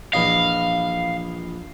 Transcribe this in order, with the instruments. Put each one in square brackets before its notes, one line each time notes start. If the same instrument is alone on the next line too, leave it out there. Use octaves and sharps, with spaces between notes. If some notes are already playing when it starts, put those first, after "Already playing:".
[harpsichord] A#1 E3 D#5 [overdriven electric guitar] F5